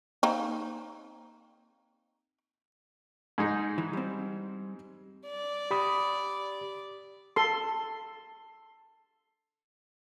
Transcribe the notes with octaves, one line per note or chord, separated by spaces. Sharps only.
A#3 C4 D#4
G#2 G#3 D#4
E3
G3 C4
D5
G4 B5 D#6
A4 C6